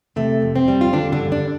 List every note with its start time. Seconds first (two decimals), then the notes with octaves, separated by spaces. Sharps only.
0.16 C3 A3
0.42 F2
0.56 C4
0.68 G3
0.81 F4
0.93 D3 G3 D4
1.12 D3 D4
1.19 G2
1.32 D3 D4